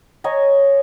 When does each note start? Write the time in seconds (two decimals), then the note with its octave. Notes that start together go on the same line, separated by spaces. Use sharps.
0.24 C#5 D#5 G#5 A#5